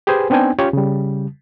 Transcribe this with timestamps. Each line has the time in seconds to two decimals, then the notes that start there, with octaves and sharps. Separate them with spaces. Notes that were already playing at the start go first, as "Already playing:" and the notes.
0.07 G4 G#4 B4 C5 G#5
0.30 B3 C4 D4 D#4 G5 G#5
0.59 C#4 F4 G4 C#5
0.73 C#3 G3